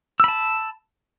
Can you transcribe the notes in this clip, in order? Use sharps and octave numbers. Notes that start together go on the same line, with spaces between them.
A5 B5 E6